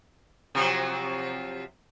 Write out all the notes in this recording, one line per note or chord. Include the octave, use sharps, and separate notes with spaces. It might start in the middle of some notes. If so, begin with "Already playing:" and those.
C3 F3 F#3